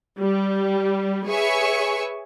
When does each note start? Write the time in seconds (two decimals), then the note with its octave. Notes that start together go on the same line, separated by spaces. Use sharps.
0.19 G3
1.27 G#4 B4 C#5 E5 G#5 C#6